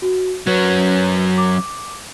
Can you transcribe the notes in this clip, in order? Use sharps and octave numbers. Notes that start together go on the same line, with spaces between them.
F#4
F#3 C#4 B4 C#5
D6